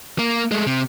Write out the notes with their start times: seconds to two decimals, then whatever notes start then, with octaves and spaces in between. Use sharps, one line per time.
0.19 A#3
0.52 G#3 A3
0.67 C3